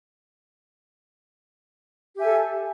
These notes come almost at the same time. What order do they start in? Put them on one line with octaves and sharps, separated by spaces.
G4 E5 G#5 A4